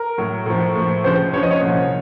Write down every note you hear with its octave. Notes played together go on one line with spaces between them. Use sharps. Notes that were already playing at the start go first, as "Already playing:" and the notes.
Already playing: A#4
A2 F#3
A2 F3
A2 F3
C#2 C#3 F3 C5
C#2 C#3 F3 C#5
D#5
C#5
C2 A#2 F3